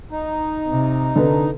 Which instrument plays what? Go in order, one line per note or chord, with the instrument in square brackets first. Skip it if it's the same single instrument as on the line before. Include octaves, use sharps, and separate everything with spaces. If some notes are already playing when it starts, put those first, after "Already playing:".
[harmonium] D#4
[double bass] C3
[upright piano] D3 A4 B4